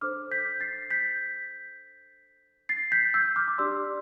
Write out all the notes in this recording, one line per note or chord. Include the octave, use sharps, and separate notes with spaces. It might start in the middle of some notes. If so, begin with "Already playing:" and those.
D4 A4 C5 D6 F6
G6 B6
A6 C7
G6 B6
A6 C7
G6 B6
E6 G6
D6 F6
D6
D4 G4 D5 C6 E6